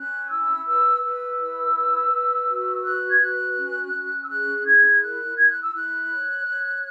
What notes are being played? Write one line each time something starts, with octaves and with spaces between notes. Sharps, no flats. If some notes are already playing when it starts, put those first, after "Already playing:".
Already playing: C#4 F#6
E4 E6
B4 E6
B4 E6
E4
B4
B4
F#4
B4 F#6
G#6
F#4 F#6
C#4
C#4
E6
G#4 F#6
E4 G#6
A#4 F#6
E4 G#6
F#6
E6
E4 F#6
C#5
C#5